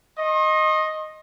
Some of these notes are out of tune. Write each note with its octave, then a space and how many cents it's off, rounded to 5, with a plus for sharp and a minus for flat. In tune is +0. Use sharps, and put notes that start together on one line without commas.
D#5 +0 C6 +45